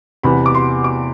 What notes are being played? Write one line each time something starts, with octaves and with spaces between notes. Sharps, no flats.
E2 C3 E3 B3 B5
D6
C6
D6